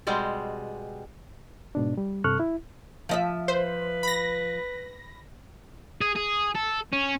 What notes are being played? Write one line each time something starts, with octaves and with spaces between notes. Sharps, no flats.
B2 G3 G#3 C4
G#2 B2 D4
G3
G2 C3 A4 C#6 F6 F#6
E4
F3 D#5 E5
B4 C5
B5 A#6
G#4
G#4
A4
C#4